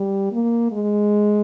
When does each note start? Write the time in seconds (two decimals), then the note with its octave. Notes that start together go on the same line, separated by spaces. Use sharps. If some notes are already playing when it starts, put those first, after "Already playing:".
Already playing: G3
0.32 A#3
0.72 G#3